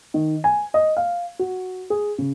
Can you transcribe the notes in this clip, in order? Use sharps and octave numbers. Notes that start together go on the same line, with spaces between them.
D#3
G#5
D#5
F5
F#4
G#4
C#3